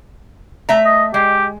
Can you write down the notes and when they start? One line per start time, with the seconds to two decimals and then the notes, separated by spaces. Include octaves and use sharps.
0.69 A3 E5 A#5
0.85 D#5
1.14 G#3 G4